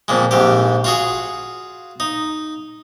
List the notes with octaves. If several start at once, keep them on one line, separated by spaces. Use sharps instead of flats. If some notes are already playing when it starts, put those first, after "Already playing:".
F2 A#2 G#3
A#1 G#2 G4
F4 F#4 G#4
D#4